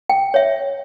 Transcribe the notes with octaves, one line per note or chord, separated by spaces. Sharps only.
G5
C#5 E5